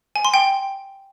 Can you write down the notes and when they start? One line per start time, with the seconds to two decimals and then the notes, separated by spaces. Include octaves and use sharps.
0.16 G#5
0.25 C6
0.34 G5